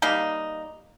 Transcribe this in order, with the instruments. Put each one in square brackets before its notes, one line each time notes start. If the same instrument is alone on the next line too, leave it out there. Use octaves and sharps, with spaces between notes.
[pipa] G3 A#3 D#4